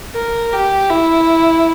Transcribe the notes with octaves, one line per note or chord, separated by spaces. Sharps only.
A#4
G4
E4